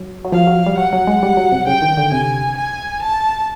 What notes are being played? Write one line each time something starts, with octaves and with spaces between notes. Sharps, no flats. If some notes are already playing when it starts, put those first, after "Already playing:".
Already playing: F#3
F#3
F3 F5
F#3
G3
F#3 F#5
F#3
G#3
G3
F#3
C3
C#3 G5
D#3
D3
C3 G#5
G#5
A5